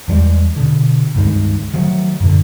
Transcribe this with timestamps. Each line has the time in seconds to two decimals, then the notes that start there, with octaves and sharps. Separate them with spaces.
0.08 E2 E3 G3 G#3
0.56 B2 D3
1.15 C#2 G2 D#3 G#3
1.73 D#3 F3 F#3 A3
2.20 F#2 A#2 D3